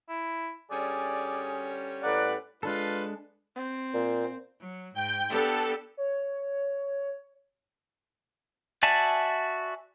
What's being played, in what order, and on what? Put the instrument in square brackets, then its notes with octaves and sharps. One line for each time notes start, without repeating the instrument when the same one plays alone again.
[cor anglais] E4
[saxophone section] D3 G3 C#4 [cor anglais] G#4 [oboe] D5
[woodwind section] A2 B4 D5 [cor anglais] A#3 [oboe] F#5
[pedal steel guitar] G#3 D4 A4 [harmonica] F4 B4
[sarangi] C4
[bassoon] A#2
[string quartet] F#3
[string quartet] G#2 [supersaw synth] G5 G6
[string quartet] B3 D4 G4 [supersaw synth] A4
[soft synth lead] C#5
[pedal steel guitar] F#4 D5 E5 G#5 A5